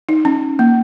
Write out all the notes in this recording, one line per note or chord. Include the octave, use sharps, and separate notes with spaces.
D#4
C#4
A#3